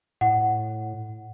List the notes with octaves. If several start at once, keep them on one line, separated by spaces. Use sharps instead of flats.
A2 F#5